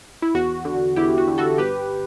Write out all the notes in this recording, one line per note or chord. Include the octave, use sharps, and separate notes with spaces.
E4
E2 F#4
D3
E2 E4 G4
F#4
D3
F#4 A4
G1 G4 B4